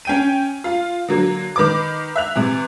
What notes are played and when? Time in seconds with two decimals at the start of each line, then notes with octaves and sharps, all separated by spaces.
0.05 C#4 G5 D#7
0.64 F4
1.09 D3 F#3 A#3
1.56 D#3 B4 D6
2.16 E5 F#6 F7
2.36 C3 E3